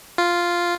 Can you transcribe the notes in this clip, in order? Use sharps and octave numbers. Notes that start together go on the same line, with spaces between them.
F4